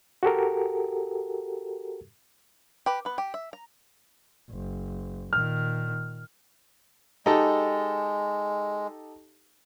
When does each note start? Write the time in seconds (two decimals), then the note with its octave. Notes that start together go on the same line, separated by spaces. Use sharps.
0.23 F#4 G4 A4 A#4
2.86 G4 B4
3.05 B3 B4
3.18 G4
3.34 E5
3.53 A#5
4.51 F#1
5.33 A#2 D#3 F6
7.26 G#3 D#4 G4 A4